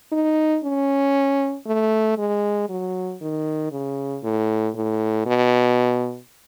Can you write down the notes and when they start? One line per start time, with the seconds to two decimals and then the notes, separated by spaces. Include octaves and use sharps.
0.12 D#4
0.64 C#4
1.67 A3
2.18 G#3
2.70 F#3
3.21 D#3
3.72 C#3
4.24 A2
4.75 A2
5.26 B2